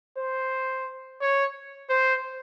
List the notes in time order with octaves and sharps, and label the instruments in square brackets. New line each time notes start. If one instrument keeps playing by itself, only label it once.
[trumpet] C5
C#5
C5